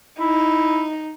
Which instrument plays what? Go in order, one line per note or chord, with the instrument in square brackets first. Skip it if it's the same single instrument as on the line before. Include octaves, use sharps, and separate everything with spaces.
[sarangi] D#4 [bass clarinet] E4